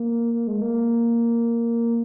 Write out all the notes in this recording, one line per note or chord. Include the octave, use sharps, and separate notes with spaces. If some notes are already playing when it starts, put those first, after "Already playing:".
Already playing: A#3
A#3
G#3
A#3